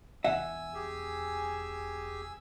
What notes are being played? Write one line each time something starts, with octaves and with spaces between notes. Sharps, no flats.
E1 E5 F#5 G#5 E6
G4 G#4